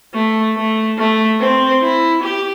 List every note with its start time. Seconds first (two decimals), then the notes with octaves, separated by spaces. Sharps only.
0.14 A3
0.56 A3
0.98 A3
1.40 C4
1.82 E4
2.23 G4